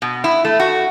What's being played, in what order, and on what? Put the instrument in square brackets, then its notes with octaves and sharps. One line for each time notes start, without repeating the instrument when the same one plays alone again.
[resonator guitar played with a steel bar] B2
E4
A3
F#4